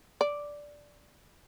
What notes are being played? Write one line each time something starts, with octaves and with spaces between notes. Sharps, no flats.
D5